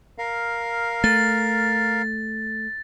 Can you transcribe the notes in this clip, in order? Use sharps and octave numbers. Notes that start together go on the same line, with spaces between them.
A#4 F5
A3 A6